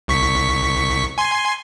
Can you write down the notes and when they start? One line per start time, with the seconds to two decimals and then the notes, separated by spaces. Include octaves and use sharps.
0.08 C2 C#6 B6
1.18 G#5 C6